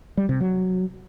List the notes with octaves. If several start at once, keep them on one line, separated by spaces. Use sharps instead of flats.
G3
C3
F#3